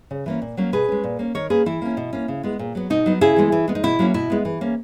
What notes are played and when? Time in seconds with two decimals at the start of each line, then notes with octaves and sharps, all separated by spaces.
0.11 C#3
0.26 E3 A#3 C#4
0.42 A#2
0.57 F#3 A#3 C#4
0.73 B2 G#4 B4
0.88 G#3 C#4
1.04 A#2
1.19 A#3 C#4
1.35 D#3 A#4 C#5
1.50 A#3 C#4 G#4 B4
1.66 E3 E4
1.82 A#3 C#4
1.97 B2
2.13 A#3 C#4
2.28 C#3
2.43 G#3 B3
2.59 A#2
2.75 F#3 B3
2.90 B2 D#4
3.06 F#3 B3
3.21 C#3 E4 G#4
3.37 E3 G#3 B3
3.52 E3
3.68 G#3 B3
3.75 D#4
3.83 B2 E4
3.99 F#3 A#3 C#4
4.14 B2 E4
4.30 G#3 B3
4.45 E3
4.61 A#3 C#4